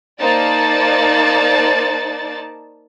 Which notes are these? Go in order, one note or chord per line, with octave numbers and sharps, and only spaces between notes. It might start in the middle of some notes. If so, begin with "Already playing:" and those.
A#3 D#4 C5 D5 A5 A6